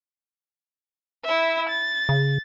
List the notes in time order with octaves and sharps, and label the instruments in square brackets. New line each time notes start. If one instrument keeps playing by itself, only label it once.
[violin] E4 E5
A6
[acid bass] C#3